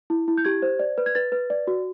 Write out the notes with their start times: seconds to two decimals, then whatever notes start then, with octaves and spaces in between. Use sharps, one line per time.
0.10 E4
0.28 E4
0.38 G6
0.45 G4 G#6
0.62 C5
0.79 D5
0.98 B4
1.06 G#6
1.15 B4 A6
1.32 B4
1.50 D5
1.67 F#4